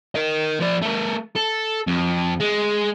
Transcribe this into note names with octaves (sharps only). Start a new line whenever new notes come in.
A#4 D#5
F3 D5
A3 A#4
A4
F2
G#3